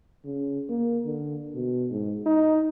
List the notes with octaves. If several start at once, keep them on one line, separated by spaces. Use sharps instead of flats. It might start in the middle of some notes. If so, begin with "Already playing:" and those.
C#3
A#3
D3
B2
G#2
D#4